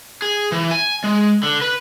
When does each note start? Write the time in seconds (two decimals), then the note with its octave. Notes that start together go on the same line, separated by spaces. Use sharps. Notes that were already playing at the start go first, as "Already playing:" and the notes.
0.22 G#4
0.52 E3
0.71 G#5
1.04 G#3
1.43 D3
1.62 B4